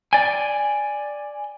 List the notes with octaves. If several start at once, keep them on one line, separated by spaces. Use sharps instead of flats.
D5 G5 G#5